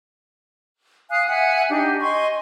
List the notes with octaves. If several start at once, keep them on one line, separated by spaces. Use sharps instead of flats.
F5 G#5 D#6 F#6
E5 F#5 G#5
D4 D#4 G4
D#5 G#5 C6 C#6